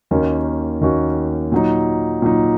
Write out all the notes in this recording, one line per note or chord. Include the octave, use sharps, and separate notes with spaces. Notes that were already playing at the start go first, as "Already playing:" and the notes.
D#2 D#3 A#3 C#4 F#4
D#2 D#3 A#3 C#4 F#4
A#2 F#3 D#4
A#2 F#3 D#4